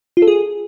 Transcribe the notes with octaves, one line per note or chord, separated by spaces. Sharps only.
F4
A4
G#4